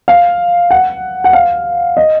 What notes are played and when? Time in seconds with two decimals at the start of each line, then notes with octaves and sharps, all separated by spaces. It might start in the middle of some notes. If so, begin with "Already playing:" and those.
0.08 F5
0.71 F#5
1.24 F#5
1.33 F5
1.97 D#5